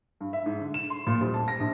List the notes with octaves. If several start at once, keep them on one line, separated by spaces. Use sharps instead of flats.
G2
E5
G#2
D3
E7
C6
A#2
D#1
A5
A#6
A#1